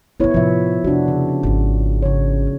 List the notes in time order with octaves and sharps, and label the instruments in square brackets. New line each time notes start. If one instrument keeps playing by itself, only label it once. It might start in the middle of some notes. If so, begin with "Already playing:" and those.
[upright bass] F2 C#4 [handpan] B3 E4 C#5
[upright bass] A2 C3 [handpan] F3 E5
[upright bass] F2 C3 [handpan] D4 F#4
[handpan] C#3
[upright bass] G#1 F4
[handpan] C#3 C#5